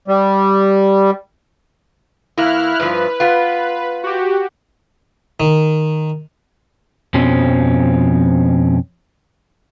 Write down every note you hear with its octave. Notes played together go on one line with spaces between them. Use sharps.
G3
E2 A#3 E4 F6 F#6
G2 F3 B4
B3 F4
F#4 G4
D#3
F2 B2 F3 C4 C#4